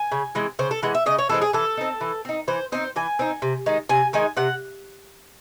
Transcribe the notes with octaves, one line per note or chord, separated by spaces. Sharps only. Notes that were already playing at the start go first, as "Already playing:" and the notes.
Already playing: G#5
C#3
E3 G#3 C4
C#3 C5
A4
E3 G#3 F#5
E5
C#3 D#5
C#5
E3 G#3 C4 A4
G#4
E3 A4
C4 D#4
E3
C4 D#4
E3 C5
C4 D#4 C5
E3 G#5
C4 D#4
C3
D#3 G#3 D#4
C3 G#5
D#3 G#3 D#4 G#5
C3 F#5